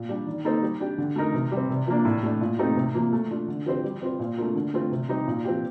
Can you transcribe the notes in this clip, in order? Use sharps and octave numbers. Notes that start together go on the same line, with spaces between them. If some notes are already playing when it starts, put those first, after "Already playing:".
Already playing: A#2
G3 D4
D#3
A#3 D#4 A4 C5
G3
D4 G4
D3
A3 D#4 A#4
C3
G3 C4
C3
F3 A#3 D4
A2
A3 D4
A#2
A3 C4 D#4 G4
C3
F3 A#3
A3
D4 F4
D3
F3 C4 G4 C5
G3
C4 F4 C5
A#2
A3 D4 F4 A#4
D3
A3 C4 F4
C3
G3 C4 D#4
A#2
F3 C4 G4